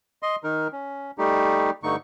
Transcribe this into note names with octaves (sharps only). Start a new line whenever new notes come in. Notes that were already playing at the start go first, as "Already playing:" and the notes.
D#5 C6
D#3 D#4 A#4
C#4
G3 A3 D#4 G4
G2 D3 A3 D#4 C#6